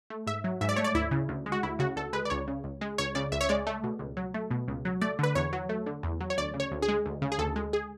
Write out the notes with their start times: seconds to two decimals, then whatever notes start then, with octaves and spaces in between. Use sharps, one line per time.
0.10 A3
0.27 G#2 E5
0.44 F#3
0.61 G#2 E5
0.69 D5
0.76 A3 C#5
0.84 D5
0.94 D2 E4
1.11 C#3
1.29 D2
1.46 G#3
1.52 F#4
1.63 D2 E4
1.79 C#3 F#4
1.96 D2 A4
2.13 G#3 B4
2.25 D5
2.30 C#2 C#5
2.48 C#3
2.64 C#2
2.81 G#3
2.98 C#2 C#5
3.15 C#3 D5
3.32 C#2 E5
3.41 C#5
3.49 G#3 D5
3.67 A3
3.84 B2
3.99 C#2
4.17 F#3
4.34 A3
4.51 B2
4.68 C#2
4.85 F#3
5.01 A3 D5
5.19 D3 B4
5.35 E2 C#5
5.53 F#3
5.69 A3
5.86 D3
6.03 E2
6.21 F#3
6.30 C#5
6.38 D2 D5
6.54 C#3
6.60 C#5
6.71 D2
6.82 G#4
6.88 G#3
7.06 D2
7.22 C#3
7.32 G#4
7.39 D2 A4
7.56 G#3
7.73 G#4